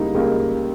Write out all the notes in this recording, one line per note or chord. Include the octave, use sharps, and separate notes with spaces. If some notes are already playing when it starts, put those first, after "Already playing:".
Already playing: C#2 C#3 G3 A#3 D#4 E4
C#2 C#3 G3 A#3